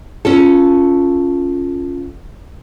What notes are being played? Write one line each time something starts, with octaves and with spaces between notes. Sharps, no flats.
C#4 F4 A4